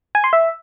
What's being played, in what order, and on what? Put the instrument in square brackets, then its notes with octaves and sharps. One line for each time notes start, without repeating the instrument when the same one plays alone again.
[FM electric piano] G#5
C6
E5